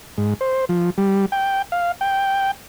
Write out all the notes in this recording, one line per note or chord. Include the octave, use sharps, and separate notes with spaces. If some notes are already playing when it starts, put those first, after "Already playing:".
G#2
C5
F3
G3
G5
F5
G5